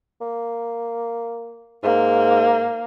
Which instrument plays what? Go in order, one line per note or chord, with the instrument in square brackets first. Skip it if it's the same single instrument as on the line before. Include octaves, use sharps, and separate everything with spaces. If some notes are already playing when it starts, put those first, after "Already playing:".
[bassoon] A#3
[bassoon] G#2 [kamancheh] A#3